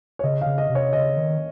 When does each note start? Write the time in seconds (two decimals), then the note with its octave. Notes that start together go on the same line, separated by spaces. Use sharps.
0.19 C#5
0.24 C#3 D#5
0.41 C#3 F5
0.58 D#5
0.69 C3
0.75 C#5
0.93 C#3 D#5
1.17 D#3